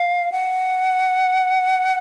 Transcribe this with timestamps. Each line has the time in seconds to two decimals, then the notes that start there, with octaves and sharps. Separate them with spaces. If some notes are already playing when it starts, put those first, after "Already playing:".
Already playing: F5
0.32 F#5